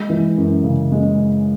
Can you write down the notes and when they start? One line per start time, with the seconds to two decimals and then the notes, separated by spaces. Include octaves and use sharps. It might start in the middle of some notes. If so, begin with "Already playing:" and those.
Already playing: G#3
0.10 E3
0.37 F#2
0.64 C#3
0.92 G#3